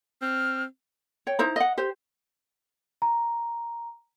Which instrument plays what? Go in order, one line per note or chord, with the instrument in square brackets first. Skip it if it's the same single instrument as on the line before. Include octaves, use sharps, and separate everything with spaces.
[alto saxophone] C4 [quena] F6
[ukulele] C#5 G5
D#4 E4 C5 A#5
D#5 F#5
G4 C5
[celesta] A#5